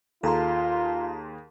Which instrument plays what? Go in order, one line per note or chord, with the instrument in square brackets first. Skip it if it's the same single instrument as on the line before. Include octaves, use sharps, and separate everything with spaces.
[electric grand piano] D#2 G#4 C6 [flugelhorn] F4 [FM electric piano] A4 A5 A#5